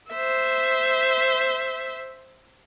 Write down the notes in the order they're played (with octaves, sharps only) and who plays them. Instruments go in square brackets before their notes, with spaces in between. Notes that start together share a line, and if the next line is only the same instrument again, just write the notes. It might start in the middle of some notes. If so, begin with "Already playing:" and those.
[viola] C5 E5